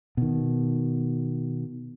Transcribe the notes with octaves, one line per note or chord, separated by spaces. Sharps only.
B2 D#3